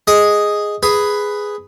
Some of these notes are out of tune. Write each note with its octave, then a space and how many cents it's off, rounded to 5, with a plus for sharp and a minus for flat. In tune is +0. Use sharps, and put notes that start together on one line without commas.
G#4 +0 D#5 +0
G#4 +0 B4 +5